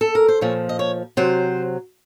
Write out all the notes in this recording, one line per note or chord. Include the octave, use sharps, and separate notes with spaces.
A4
A#4
C5
A#2 F3 C#5
D#5
C#5
C3 F#3 C5